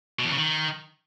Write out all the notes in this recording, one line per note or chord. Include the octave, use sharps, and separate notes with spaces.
B2
E2
C#3
D#3